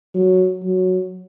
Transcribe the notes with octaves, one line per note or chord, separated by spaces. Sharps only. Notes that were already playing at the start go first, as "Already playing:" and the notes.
F#3
F#3